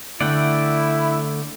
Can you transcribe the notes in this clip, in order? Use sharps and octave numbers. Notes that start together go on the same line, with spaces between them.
D3 A3 E4 D5 F#5 G5